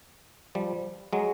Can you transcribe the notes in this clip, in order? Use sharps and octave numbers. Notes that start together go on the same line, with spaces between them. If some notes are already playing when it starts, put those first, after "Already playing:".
F3 G3
F#3 G#3